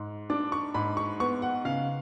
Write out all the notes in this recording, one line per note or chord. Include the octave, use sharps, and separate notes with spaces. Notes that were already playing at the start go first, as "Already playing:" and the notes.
Already playing: G#2
D4 D6
C#6
G#2 B5
C#6
B3 C#6
F#5
C#3 F5